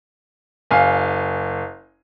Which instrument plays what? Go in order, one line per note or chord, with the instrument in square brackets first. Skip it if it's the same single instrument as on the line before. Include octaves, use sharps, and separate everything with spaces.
[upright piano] F#1 F5 G#5